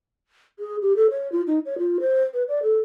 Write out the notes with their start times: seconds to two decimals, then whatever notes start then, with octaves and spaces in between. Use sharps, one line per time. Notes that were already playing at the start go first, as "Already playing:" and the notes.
0.59 G#4
0.82 G4
0.96 A4
1.10 C#5
1.32 F4
1.47 D#4
1.66 C#5
1.78 F4
2.00 C5
2.34 B4
2.48 D5
2.63 A4